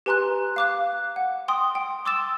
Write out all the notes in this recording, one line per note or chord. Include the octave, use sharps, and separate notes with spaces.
G4 B4 G#5 A#5 C6 F#6
F5 D6 F#6
F#5
G5 C6 D#6
G5
C6 D6 E6 A6 E7